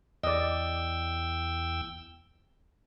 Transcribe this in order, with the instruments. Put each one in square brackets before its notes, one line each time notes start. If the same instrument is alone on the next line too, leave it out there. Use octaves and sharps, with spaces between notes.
[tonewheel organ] E2 G5 E6 [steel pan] D5 D#5